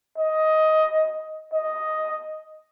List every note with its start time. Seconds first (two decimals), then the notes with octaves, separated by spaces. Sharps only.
0.17 D#5
1.53 D#5